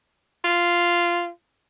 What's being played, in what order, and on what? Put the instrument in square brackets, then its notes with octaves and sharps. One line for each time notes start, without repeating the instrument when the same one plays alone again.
[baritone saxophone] F4